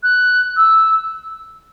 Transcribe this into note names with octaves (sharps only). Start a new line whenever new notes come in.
F#6
E6